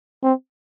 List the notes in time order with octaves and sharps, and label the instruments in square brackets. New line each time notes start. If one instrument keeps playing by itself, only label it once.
[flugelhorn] C4